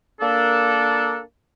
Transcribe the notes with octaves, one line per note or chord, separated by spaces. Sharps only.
A#3 D4 A4